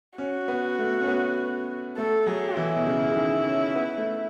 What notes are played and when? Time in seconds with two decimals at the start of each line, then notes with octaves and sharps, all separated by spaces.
0.18 C#4 F#4
0.48 B3
0.79 A3
1.01 C#4
1.07 B3
1.97 A3 A4
2.26 F#3 G#4
2.56 E3 E4
2.76 B2
2.87 C#3
3.11 C#3
3.16 D#3
3.47 C#4
3.75 B3
3.98 A3